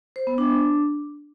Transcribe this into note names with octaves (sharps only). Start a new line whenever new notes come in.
C5
B3
D4